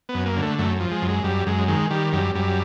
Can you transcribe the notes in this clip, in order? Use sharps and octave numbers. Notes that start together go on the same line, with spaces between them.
B3
F#2
A#3
D3
A3
F#2 A3
F3
G#3
F#2
G#3
F#2 G3
F#2 G#3
D#3 G#3
D#3 G3
F#2 G3
F#2 G3